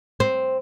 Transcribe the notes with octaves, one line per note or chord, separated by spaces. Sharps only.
C4